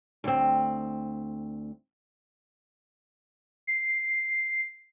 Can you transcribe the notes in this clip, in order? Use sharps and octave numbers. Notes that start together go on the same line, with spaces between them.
D2 C4
C7